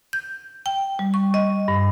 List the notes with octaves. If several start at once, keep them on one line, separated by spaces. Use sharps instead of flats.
G6
G5
G3
C#6
D#5
G2